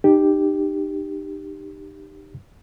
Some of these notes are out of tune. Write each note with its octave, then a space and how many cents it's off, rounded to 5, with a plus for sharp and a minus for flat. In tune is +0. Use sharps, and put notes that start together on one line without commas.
D#4 -30 G4 +0